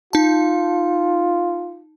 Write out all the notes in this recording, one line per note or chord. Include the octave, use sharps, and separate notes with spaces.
D#4 F4 A5